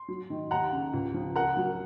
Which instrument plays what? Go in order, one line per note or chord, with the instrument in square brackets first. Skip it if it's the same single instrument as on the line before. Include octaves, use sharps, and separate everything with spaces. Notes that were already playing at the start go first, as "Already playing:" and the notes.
Already playing: [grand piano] C6
[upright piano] F#3
D#3
[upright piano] D#2 [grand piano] F#5 A#5
[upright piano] C#3
C#2
F3
[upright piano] A#4 [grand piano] F#5 A#5
[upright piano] F#3